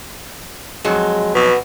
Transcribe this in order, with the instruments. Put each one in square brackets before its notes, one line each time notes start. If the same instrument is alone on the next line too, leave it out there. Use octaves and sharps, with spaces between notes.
[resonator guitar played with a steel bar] F2 F#3 [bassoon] G#3
[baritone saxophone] B2 [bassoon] B3